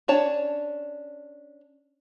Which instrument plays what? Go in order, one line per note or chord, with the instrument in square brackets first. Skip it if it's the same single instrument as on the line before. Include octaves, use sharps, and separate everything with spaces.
[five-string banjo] C#4 D4 C#5 A5